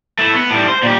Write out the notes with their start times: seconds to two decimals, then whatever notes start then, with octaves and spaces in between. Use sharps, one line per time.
0.19 A3 E4
0.34 B3
0.51 A2 G3
0.68 C5
0.83 A#2 G4